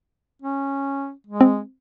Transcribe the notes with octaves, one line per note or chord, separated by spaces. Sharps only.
C#4
G#3
C4